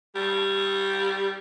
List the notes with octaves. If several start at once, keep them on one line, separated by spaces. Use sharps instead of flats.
G3